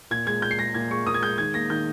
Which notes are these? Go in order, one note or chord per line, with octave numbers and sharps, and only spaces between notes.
A#2 G#6
G#3 G#6
A#2 G6
C7
G#3 A#6
A#2 G#6
G#3 C#6
A#2 D#6
G#6
G#3 G6
D#3 G#6
A#3 A#6
D#3 G6